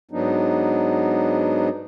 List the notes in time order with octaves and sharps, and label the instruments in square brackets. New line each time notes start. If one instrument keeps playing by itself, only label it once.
[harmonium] G#2 F#3 B3 D4 D#4